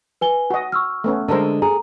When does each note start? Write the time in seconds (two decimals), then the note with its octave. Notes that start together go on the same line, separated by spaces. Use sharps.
0.21 B4 G#5 G7
0.50 F#4 D#5
0.72 C#6 E6 F6
1.04 A3 B3 C#4
1.28 D3 G#3 A4 A#4 C5
1.62 G#4 A#5